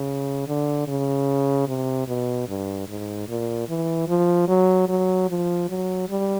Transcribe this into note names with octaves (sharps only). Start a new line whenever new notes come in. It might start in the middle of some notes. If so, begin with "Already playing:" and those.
Already playing: C#3
D3
C#3
C3
B2
G2
G#2
A#2
E3
F3
F#3
F#3
F3
F#3
G3